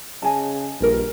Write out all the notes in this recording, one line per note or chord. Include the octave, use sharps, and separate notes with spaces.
C#3 D#5 G#5 A5
A#1 G2 A#4